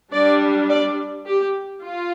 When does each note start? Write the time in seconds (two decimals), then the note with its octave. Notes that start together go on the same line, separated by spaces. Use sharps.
0.12 G3 D4 D5
0.69 D5
1.26 G4
1.83 F4